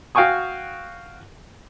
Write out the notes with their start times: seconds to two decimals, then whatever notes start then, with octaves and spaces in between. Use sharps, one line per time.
0.15 F#4 F5 G5 G#5 C#6 D#6